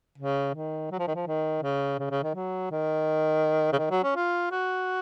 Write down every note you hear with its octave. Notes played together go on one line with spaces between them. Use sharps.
C#3
D#3
F#3
F3
D#3
F3
D#3
C#3
C#3
C#3
D#3
F#3
D#3
C#3
D#3
F#3
C#4
F4
F#4